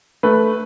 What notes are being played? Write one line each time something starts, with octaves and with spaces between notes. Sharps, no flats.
A3 B4